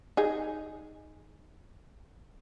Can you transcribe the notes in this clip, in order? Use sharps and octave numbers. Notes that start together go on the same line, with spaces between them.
D#4 G#4